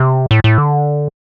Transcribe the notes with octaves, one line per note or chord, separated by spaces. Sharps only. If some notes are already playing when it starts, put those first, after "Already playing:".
Already playing: C3
A2
A2
D3